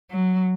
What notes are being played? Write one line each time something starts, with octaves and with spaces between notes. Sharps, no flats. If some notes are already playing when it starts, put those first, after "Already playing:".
F#3